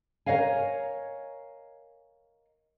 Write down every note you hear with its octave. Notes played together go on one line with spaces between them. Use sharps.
A#4 B4 C#5 D#5 F5 G#5